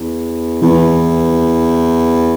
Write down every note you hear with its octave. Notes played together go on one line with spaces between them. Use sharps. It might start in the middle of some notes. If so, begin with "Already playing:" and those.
Already playing: E2
E2 E3